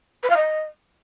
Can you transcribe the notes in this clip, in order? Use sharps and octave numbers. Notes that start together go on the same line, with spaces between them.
B4
F5
D#5